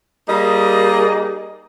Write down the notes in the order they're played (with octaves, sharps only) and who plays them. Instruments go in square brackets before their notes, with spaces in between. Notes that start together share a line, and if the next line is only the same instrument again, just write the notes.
[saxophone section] G3 A#3 D#4 G#4 D#5